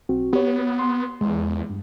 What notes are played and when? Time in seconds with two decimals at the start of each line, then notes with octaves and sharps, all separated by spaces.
0.09 B1 C4 F#4
0.33 B3 G4 C#5
0.79 C6
1.21 E2 G#3
1.70 G2